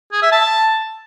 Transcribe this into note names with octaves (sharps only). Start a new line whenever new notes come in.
G#4
E5
A5